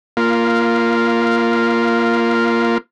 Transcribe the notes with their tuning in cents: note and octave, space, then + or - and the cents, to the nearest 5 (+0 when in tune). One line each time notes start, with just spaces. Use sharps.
A#3 +0 F4 -10